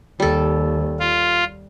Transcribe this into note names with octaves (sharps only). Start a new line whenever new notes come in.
D#2 G3 A4
F4